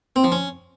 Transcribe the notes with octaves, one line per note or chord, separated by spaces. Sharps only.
C4
F3
C#4